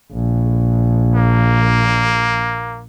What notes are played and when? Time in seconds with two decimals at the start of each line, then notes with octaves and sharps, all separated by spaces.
0.13 A#1
1.15 A#3